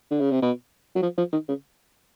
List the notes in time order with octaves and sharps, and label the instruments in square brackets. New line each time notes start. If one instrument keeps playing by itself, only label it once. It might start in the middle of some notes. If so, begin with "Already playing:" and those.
[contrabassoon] D3
C#3
C3
B2
F#3
F3
F3
D#3
C#3